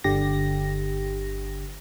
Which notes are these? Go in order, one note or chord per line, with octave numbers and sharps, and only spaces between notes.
G1 D3 G4 A#6